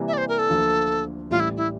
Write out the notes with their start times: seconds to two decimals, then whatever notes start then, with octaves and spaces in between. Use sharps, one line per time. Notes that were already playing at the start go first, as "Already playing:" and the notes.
Already playing: C3 E3 G3 A#3
0.08 E5
0.13 D5
0.18 C5
0.29 A#4
0.38 A4
0.49 D2 D3 F3 A#3
1.31 A1 A2 E3 G3 F4
1.40 E4
1.57 E4